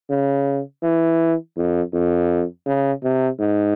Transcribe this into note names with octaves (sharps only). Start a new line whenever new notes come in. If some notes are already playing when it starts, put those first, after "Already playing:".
C#3
E3
F2
F2
C#3
C3
G#2